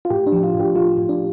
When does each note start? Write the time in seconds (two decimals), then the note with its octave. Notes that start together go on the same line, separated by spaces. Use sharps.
0.05 F4
0.10 A2 G4
0.27 D4
0.32 F3
0.43 F4
0.54 A2
0.60 G4
0.76 F3 F4
0.98 A2
1.09 D4